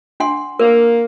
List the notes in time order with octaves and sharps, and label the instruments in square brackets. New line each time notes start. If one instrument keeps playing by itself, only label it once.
[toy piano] D4 F#5 C6
[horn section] A#3 [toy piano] A#4